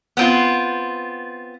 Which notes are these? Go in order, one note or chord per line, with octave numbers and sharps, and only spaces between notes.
B3 C4 F4